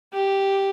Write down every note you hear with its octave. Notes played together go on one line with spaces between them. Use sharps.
G4